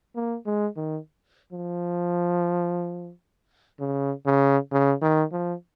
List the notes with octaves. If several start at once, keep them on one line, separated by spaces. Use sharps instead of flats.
A#3
G#3
D#3
F3
C#3
C#3
C#3
D#3
F3